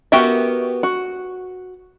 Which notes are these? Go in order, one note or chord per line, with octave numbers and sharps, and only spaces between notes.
B3 F#4 G4 A#4 E5
F#4